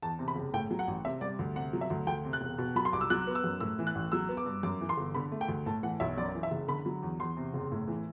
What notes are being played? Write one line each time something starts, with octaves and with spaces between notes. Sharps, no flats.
E2 A5
C3
B5
F#1
A2 G5
F#3
F#5
A1
C3 E5
G3 D5
D2
C3 F#5
F#3
E5
D2
D2 G5
C3
F#6
E1
B2
F#3 B5
C6
C2 D6
E6
F#3 F#6
B3
E6
F#2
A2 E6
E3
F#6
A1
F#3 E6
B3
D6
G2
F#2 D6
E3
C6
G1
D3 B5
A3
G5
D2
A2 A5
E3 F#5
B1 E5
F#2 D5
E3
E5
F#1
D3 B5
F#3
E2
E2 C6
C3
F#1
A2
E3